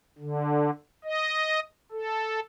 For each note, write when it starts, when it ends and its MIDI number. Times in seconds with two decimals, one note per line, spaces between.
0.18 0.70 50
1.04 1.60 75
1.92 2.40 69